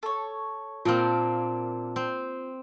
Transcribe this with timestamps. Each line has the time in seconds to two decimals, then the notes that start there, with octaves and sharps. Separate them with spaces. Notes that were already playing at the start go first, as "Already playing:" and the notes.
0.03 A4 C#5
0.85 A#2 A#3 C4 D4 F4
1.96 C4